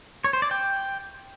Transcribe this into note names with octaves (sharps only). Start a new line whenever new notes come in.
C#5
C5
D5
G5